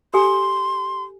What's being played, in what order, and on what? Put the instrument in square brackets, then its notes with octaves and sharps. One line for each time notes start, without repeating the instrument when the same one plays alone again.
[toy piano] G4 A4 G#5 [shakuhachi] C6